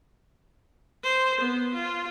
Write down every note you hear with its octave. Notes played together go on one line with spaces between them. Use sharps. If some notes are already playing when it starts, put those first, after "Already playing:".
C5
B3
F4